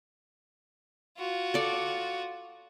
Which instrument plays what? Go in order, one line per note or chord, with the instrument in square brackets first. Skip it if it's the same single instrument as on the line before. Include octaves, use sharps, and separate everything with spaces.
[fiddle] F4 F#4
[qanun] A4 D5